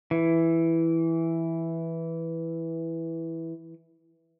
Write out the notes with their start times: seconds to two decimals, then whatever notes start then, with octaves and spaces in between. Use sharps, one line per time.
0.11 E3